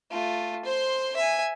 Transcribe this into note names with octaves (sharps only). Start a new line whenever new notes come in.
A3 F4
C5 C6
E5 G#5